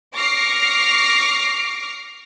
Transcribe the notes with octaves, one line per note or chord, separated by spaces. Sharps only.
C#6 D6 F6 A#6 C7